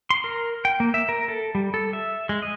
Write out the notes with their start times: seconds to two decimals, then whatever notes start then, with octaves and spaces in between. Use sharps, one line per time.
0.10 C6
0.24 A#4
0.65 G5
0.80 A#3
0.94 E5
1.09 A#4
1.28 A4
1.55 G3
1.74 A4
1.93 E5
2.29 G#3
2.42 D#5